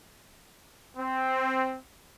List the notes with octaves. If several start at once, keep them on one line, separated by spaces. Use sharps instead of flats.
C4